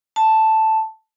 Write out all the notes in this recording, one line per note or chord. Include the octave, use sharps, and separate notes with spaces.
A5